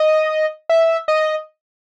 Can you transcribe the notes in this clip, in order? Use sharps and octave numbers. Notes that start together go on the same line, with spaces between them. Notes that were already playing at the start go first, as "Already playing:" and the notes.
Already playing: D#5
E5
D#5